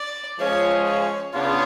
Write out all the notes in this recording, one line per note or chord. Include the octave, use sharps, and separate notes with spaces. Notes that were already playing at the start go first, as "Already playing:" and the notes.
Already playing: D5
F3 G#3 C#4 F4 G#4 C#5
C#5
C#3 B3 D4 F4 C#5